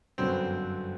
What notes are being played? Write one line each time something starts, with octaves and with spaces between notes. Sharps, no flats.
G1 F#2 D3 F#3 B3 C4